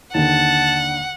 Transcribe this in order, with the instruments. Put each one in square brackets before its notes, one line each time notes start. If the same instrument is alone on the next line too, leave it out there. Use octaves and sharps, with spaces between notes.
[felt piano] D#2 D3 [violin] F#5 [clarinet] A5